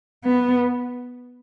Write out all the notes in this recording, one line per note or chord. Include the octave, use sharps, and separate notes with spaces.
B3